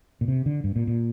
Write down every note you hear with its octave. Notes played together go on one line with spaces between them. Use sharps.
A#2
C3
D3
G2
A#2
A#2